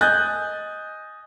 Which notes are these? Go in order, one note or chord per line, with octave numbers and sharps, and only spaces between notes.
D#5 G#5 F#6 G6 A6